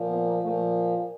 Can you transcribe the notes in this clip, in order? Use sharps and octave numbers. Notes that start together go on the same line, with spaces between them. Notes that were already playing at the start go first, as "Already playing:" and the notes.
Already playing: A#2 F3
B3
A#3
A#2 F3 A3